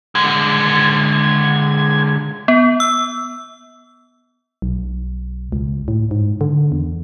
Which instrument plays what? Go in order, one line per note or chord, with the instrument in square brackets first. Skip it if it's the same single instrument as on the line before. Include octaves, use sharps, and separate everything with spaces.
[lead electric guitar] D3 G#3 [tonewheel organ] G#6
[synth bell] B3
E6
[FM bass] B1
C#2
A2
G#2
D3
E2